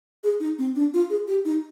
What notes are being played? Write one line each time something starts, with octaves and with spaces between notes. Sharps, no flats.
G#4
D#4
C4
D4
F4
G#4
G4
D#4